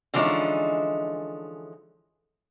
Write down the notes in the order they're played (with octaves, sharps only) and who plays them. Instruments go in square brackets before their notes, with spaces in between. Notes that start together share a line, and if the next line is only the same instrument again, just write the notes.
[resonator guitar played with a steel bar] D3 E3 F3 G#3 C#4 D#4